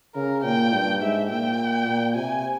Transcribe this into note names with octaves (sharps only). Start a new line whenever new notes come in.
C#3 A#4
A#2 G5
G2
G#2 E5
A#2 G5
A#2
C3 G#5